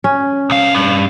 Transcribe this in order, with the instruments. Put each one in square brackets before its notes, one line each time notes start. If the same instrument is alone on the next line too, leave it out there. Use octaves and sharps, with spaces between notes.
[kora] C#4
[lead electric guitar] B1 F5
G2